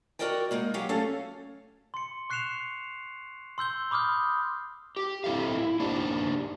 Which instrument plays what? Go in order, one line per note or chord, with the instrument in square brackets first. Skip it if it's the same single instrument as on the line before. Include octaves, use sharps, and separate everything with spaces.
[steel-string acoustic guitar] F#4 A4 A#4 D5 D#5 G5
G#3 A#3 D#4 F#5
F#3 G4 G#4 F5
F#3 A3 C#4 A4 F5
[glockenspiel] C6 C#7
C#6 F#6 C7 C#7 E7 F7
C6 E6 G6 G7
B5 D6 D#6 F6 G6
[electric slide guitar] G4
C4 E4 F#4 A4 E5 F5
E4
A#3 D4 D#4 G4